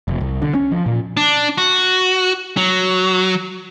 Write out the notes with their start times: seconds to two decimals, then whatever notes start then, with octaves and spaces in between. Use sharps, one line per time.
0.08 F1
0.21 C2
0.42 D3
0.55 C#4
0.72 F3
0.86 A#2
1.17 D4
1.58 F#4
2.57 F#3